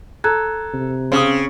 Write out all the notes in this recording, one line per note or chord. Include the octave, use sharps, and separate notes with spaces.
A4 A#5 F#6 G#6
C3
C#3 C4 D#6